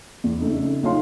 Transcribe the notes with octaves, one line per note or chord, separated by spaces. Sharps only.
E2
F2 C#3 A3 D#4
B1 D#4 F4 C#5 F5 C6